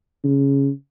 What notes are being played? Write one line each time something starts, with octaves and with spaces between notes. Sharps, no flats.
C#3